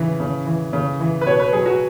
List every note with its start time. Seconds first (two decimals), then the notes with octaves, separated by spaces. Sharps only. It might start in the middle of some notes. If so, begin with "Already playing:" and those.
Already playing: C#3 E3
0.20 C#3
0.46 E3
0.73 C#3
1.00 E3
1.21 B4
1.26 B2 C#5
1.39 B4
1.53 F#3 G#4
1.66 F#4